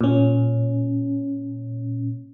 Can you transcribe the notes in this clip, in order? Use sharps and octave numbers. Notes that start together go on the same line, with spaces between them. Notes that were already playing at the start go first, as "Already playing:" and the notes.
A#2 C#4